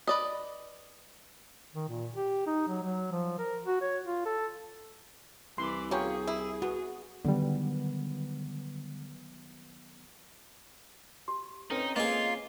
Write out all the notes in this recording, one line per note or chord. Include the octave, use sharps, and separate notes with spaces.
B4 D5 D#5
D#3
A#2
G4
D#4
F#3
F#3
F3
A#4
F#4
C#5
F4
A4
C2 E3 D5 C6
A#3 C#4 F#4 G#4 C#5 G5
E4
B3 F#4
D3 D#3 F#3 G3 B3
G4 C6
C4 C#4 D#4 A4 B4 G5
A#3 F4 G#4 D#5